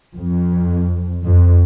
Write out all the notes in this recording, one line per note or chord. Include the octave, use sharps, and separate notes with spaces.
F2
F2